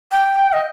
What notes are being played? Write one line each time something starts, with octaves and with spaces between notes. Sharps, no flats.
G5
D#5